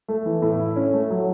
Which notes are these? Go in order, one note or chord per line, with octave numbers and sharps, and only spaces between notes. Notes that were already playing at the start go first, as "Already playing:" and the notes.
A3
E3
A2
E4
C#4
A3
F#3